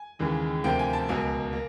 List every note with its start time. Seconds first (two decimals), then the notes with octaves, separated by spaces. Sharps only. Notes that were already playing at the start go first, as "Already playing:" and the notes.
Already playing: G#5
0.19 D#2 C#3 E3 G#3
0.64 D2 C3 F3 A#3 G5
0.79 G#5
0.93 A5
1.08 C#2 B2 F#3 A#3 G#5
1.53 A#3